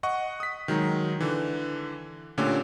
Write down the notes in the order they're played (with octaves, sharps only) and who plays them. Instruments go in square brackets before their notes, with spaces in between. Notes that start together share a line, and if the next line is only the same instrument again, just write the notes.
[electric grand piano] D#5 F#5 C#6
D#6 B6
D#3 F#3 G#3 D#4
D3 E3
A#2 D3 A3 C#4 G4